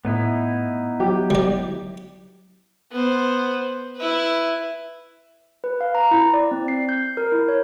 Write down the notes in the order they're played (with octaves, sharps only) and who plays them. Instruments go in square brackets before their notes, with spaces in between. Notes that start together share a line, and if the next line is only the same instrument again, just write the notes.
[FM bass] A2 [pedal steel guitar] B3 D#4 E4
[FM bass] F#3 [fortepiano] G4
[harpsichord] G3 D5
[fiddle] B3 C5
E4 B4
[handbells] B4
F5
A#5
E4
D5
C4
C7
G6
A#4
E4
C#5